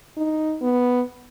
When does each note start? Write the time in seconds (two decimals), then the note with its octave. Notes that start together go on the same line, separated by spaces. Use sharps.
0.17 D#4
0.62 B3